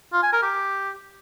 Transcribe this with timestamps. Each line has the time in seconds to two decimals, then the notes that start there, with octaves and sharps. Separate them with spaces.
0.13 F4
0.23 G#5
0.33 A#4
0.43 G4